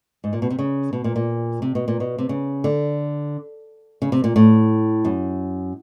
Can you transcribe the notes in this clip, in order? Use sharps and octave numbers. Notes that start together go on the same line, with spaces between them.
G#2
A#2
B2
C3
C#3
B2
A#2
A#2
C3
B2
A#2
B2
C3
C#3
D3
C#3
C3
A#2
A2
F#2